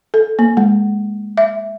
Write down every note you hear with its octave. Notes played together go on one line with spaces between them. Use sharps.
A4
A#3
G#3
E5